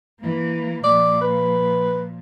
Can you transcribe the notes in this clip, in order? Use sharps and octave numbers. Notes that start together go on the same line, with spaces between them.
E3 A#3
A#2 F3 D5
B4